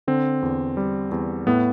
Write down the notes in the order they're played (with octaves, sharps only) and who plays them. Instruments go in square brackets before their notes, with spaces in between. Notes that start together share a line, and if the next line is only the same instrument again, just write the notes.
[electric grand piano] D3 C4
E2
G3
E2
A2 B3